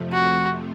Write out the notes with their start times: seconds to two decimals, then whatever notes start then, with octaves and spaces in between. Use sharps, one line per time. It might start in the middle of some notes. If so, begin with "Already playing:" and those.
Already playing: F2 C3 F3 A3
0.13 F#4